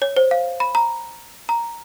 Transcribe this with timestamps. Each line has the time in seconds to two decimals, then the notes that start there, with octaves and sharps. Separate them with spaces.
0.02 C#5
0.17 C5
0.31 F5
0.60 B5
0.75 A#5
1.49 A#5